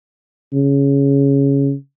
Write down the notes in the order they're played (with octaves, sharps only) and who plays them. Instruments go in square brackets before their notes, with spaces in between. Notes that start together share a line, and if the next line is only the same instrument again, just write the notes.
[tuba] C#3